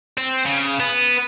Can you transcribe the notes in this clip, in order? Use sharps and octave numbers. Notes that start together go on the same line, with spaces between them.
C4
C#3
B3